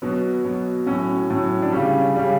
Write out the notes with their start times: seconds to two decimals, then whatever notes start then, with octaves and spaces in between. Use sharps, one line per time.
0.02 B2 F#3 B3
0.45 B2 F#3
0.86 A2 F#3 C#4
1.30 A2 F#3
1.62 D4
1.72 C#3 G3 C#4
2.16 C#3 G3